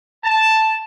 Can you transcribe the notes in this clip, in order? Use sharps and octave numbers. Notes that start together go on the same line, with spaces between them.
A5